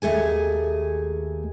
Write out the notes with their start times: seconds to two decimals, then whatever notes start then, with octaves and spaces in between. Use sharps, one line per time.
0.02 D#2 A3 G#4 G#5